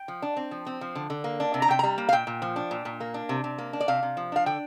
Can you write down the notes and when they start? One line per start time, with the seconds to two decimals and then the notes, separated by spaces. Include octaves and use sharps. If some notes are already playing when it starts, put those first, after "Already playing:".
Already playing: G5
0.08 F3
0.22 D4
0.36 C4
0.51 F3
0.66 C4
0.81 F3
0.95 D3
1.10 D3
1.24 A#3
1.40 D4
1.54 C3
1.62 A#5
1.68 C3 G5
1.79 G3 A#5
1.98 A#3
2.09 F5
2.12 A#2 G5
2.27 A#2
2.42 F3
2.56 D4
2.71 A#2
2.85 A#2
3.00 A#3
3.14 D4
3.29 C3
3.44 C3
3.58 A#3
3.73 D4
3.80 D5
3.88 C3 F5
4.03 C3
4.17 F3
4.32 D4 F5
4.46 D3 G5